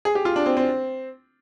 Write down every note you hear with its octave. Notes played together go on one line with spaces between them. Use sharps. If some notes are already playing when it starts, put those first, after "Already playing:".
G#4
G4
F4
D4
C4
C4